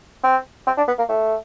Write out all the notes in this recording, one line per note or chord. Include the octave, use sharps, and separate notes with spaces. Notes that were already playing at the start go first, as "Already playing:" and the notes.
C4
C4
D4
B3
A#3
A3